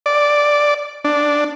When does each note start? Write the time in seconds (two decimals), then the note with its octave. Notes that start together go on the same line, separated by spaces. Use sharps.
0.06 D5
1.04 D4